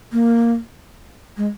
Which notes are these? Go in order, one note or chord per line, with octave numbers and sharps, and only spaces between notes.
A#3
G#3